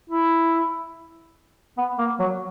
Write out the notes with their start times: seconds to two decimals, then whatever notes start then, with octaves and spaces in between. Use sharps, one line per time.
0.10 E4
1.78 B3
1.99 A#3
2.20 F#3